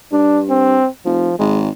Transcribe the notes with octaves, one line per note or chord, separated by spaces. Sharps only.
G2 D4
C4
F1 F3
G#1 G#3